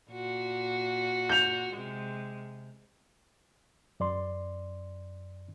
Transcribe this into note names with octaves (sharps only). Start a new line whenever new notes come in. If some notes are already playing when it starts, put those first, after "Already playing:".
A#2 F#4
G6 F7
C3 G#3
F#2 D5 C6